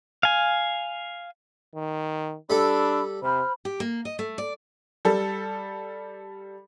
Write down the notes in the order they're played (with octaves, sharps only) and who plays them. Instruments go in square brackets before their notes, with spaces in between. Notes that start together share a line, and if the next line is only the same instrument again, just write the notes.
[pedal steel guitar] F5 G#5
[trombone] D#3
[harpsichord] G3 A4 [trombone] D4 [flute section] B5 E6
[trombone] C3 [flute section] C5 B5 F6
[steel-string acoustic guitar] G4
A#3
D#5
A3
D5
[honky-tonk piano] G3 A4